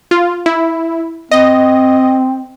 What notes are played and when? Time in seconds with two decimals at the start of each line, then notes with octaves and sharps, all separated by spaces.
0.11 F4
0.46 E4
1.31 C4 D#5